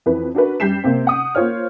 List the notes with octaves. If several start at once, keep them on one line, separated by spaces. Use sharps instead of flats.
F2 E3 B4
D4 F#4 A#4 B4
F#2 G3 G6 B6 C7 E7
C3 A#3 C4
F#5 D#6
A#3 F4 C5 C#5 F6